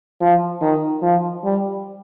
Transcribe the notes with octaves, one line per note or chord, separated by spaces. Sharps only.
F3
D#3
F3
G3